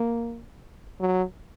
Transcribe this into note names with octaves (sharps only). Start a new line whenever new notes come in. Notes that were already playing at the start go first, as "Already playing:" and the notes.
Already playing: A#3
F#3